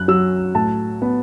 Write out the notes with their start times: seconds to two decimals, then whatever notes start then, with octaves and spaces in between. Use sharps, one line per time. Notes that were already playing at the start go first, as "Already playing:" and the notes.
Already playing: F#2 F#6
0.08 F#3 E6
0.55 A2 A5
1.02 B3